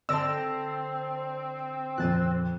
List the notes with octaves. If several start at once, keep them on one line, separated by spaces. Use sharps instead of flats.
D3 C4 D5 A5 E6 A#6
F2 A#2 F#6 A6 D#7